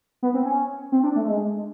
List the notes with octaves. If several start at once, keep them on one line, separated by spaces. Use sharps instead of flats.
B3
C4
C#4
C4
D4
A3
G#3